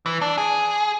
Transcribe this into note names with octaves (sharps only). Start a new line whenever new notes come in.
E3
D4
G#4